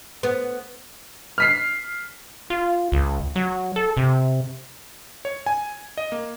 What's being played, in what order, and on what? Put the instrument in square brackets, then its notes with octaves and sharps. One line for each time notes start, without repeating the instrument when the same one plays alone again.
[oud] B3
[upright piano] F6 B6 C7
[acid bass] F4
C#2
F#3
A4
C3
[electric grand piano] C#5
G#5
D#5
A#3